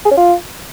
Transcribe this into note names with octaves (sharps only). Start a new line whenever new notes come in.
G#4
C#4
F4